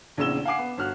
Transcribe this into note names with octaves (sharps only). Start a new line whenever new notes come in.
A#1 E2 C#3 E6 E7 G7
F5 F#5 G#5 D6 C7
B3
G1 F#4 F6 F#6